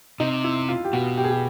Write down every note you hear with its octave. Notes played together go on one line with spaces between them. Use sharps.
C3 D#4
E4
F4
G4
B2 F#4
G4
G#4
G4